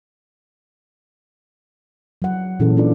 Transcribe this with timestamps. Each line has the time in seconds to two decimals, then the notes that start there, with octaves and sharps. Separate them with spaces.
2.22 F#3 F#5
2.60 A#2 E3 C#4 G#4 A4
2.77 C#4 D4 F4 A4 D5